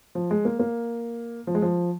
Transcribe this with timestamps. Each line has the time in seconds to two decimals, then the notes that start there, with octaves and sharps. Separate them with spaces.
0.15 F3
0.31 G#3
0.45 A#3
0.59 A#3
1.47 F3
1.55 G#3
1.62 F3